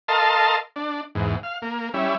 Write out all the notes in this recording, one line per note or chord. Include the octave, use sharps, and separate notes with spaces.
A4 A#4 D#5 F5 A5 C6
D4
E2 G#2
F5
A#3
G3 C#4 E4